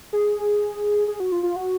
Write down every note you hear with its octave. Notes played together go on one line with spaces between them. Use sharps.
G#4
G#4
F#4
F4
F4
F#4